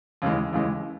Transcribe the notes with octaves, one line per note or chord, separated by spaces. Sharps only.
D#2 C#3 E3 G#3
D#2 C#3 E3 G#3